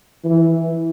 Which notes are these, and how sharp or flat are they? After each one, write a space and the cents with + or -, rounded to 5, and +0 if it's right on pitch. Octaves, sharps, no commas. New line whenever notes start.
E3 -5